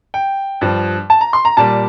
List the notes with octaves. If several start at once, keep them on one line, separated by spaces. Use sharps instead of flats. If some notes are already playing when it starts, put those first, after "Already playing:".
G5
G2 F3
A5
A#5
C6
A#5
A#2 G3 A5